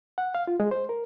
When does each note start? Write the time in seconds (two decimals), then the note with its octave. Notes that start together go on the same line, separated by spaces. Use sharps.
0.18 F#5
0.35 F5
0.47 F4
0.60 G#3
0.71 C5
0.89 A#4